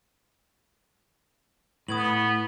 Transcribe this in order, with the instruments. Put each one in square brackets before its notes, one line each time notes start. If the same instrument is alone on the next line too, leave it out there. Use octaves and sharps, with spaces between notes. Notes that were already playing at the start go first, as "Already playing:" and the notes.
[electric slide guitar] A2 [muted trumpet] B3 [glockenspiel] D#6 G#6 F#7